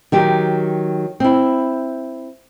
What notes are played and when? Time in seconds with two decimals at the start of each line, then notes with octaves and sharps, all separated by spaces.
0.12 D#3 F#3 G4
1.20 C4 E4